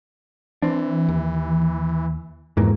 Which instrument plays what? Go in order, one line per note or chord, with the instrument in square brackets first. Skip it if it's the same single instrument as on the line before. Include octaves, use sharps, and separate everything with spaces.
[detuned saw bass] E3 [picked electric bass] C4 D4
[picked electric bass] D#2
[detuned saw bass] F2 [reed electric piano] G#2 [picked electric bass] B2 E3 A#3